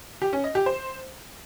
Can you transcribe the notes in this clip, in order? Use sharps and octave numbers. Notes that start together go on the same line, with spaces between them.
G4
C#4
D#5
G4
C5